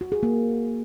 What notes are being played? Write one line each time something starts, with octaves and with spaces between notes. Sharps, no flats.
F#4
G#4
A#3